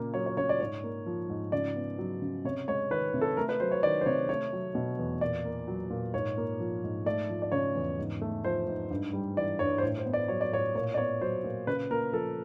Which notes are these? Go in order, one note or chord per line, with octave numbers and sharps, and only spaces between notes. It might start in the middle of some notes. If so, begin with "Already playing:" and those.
Already playing: A#2 C#3 A#3
F#3 C#5
C#5
C#3 C#5
D5
G#2 C#5
A#3
F3
G#2
C#3 D5
B3
F#3
C#3
C3 C#5
G#3 C#5
D#3 B4
C3
A4
A3 A#4
B4
F#3 C5
C#5
D#3 D5
C5
C3 C#5
A3 C#5
F#3
B2
E2
A#2 D5
A#3
F#3
A#2
G#2 C#5
A#3
F3
G#2
A3 D5
F3
D5
C#3 C#5
E2
G#2
A3
F3 C5
G#2
G2
G3
E3 D5
G2 C#5
C5
A2 C#5
C5
B3
D5
F#3 C#5
D5
A2 C#5
A#2 C#5
D5
B3 C#5
F#3 C5
A#2
C#3 B4
A#3 A#4
F3 A4